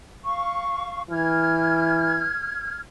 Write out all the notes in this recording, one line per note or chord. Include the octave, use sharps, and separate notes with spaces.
F5 C#6
E3 F6 G#6